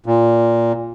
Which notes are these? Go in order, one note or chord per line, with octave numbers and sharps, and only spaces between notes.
A#2